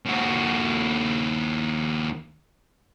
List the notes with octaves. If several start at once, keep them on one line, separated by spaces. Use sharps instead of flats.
D#2 F#4